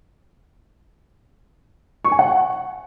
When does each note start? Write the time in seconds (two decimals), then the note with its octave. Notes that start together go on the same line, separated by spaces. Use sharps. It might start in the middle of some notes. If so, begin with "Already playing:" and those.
2.05 C#6
2.12 G#5
2.19 F#5